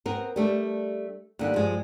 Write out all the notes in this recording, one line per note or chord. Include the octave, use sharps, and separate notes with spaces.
B3 C4 A#4
G3 A3 D4
D#2 D3 G3
G2 F3 G#3